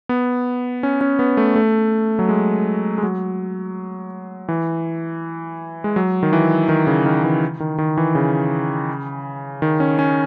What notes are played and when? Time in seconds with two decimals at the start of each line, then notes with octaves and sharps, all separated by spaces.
0.09 B3
0.83 C#4
1.01 C#4
1.19 B3
1.37 A3
1.55 A3
2.19 F#3
2.29 G#3
2.98 G#3
3.03 F#3
4.49 E3
5.84 G#3
5.96 F#3
6.23 D#3
6.33 E3
6.69 D#3
6.87 C#3
7.06 D#3
7.24 E3
7.60 D#3
7.78 D#3
7.97 E3
8.15 C#3
9.62 D#3
9.80 C#4
9.99 C#4